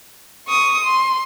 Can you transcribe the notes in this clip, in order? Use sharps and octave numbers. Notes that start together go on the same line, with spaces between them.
C#6 D#6
C6